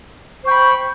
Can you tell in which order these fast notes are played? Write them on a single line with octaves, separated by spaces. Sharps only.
C5 C#6 G5 B5